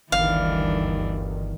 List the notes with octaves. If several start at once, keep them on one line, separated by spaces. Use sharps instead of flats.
G1 D2 G2 D#3 E3 D4 F5